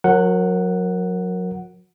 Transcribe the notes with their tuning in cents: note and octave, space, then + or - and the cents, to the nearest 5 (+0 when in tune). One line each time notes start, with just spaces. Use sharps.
F#3 -30 A#4 +0 F#5 +0